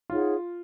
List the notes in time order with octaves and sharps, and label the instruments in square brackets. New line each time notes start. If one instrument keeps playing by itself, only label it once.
[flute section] D#4 G#4 C#5 F#5 [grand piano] F4